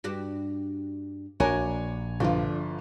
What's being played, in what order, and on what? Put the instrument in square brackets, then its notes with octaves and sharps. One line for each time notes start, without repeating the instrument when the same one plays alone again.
[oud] G2 F#4 G4
[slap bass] A#1 [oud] D4 F#4 A#4 [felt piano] C#5 G#5
[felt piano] G1 F3 F4 [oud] D3